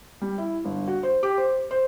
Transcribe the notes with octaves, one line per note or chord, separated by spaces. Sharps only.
G3
E4
G1
F#4
C5
G4
C5
C5